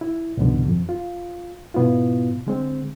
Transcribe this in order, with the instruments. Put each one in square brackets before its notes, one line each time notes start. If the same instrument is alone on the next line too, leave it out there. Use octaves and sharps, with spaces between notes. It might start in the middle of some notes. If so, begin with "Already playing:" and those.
[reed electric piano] E4
C2 F2 G#2 B2 D3
F2
F4
G#2 B2 B3 E4 F4
D3 G#3 C4